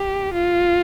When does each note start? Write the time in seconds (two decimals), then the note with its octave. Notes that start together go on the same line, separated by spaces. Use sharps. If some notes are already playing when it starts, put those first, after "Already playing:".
Already playing: G4
0.33 F4